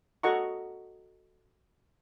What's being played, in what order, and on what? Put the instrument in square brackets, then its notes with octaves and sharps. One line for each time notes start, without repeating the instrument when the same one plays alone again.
[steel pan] F#4 A4 D#5 F#5 A#5 C#6